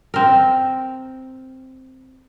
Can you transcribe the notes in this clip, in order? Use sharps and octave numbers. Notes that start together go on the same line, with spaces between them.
C4 A#4